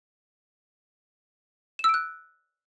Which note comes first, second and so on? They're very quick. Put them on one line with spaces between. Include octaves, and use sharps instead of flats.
E7 E6 D7 F#6